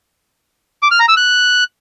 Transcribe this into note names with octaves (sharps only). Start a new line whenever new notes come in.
D6
F6
A#5
E6
F#6